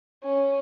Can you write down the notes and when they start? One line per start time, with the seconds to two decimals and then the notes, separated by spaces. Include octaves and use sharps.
0.24 C#4